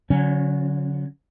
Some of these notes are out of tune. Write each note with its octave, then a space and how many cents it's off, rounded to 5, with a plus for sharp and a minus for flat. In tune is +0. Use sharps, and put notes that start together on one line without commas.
D3 -45 F#3 -25 C#4 +0